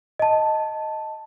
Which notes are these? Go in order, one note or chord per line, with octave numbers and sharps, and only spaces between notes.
D#5 A5